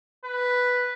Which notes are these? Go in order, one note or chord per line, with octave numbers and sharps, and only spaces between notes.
B4